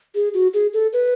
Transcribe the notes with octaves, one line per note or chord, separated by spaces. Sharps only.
G#4
F#4
G#4
A4
B4